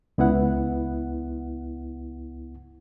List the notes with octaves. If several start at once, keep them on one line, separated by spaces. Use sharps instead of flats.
C#2 B3 E4 F#5